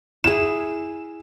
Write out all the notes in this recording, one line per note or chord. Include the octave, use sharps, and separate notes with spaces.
E4 G#4 E7